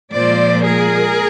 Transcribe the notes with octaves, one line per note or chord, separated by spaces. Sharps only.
A#2 F3 G#3 C5 D5
G#4 A#4